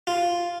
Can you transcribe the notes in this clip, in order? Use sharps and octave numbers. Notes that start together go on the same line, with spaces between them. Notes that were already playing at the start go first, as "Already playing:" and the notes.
F4